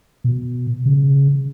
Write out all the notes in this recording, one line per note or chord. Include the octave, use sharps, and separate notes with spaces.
B2
C#3